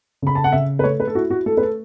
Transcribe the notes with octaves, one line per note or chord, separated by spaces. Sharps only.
C#3 B5
A5
F#5
C#3 E5
B4
A3 C#5
B4
A4
E4 F#4
F#4
A3 A4
B4
A4